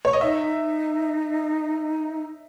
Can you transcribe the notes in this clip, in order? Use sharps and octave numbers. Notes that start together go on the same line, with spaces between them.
C#5
D#5
D#4 E5